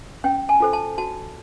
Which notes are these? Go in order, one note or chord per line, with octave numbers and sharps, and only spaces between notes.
C#4 G5
G#5
F4 A4 C5
A5
F#4 A5